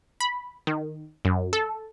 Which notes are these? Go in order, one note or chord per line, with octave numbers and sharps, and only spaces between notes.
B5
D#3
F#2
A4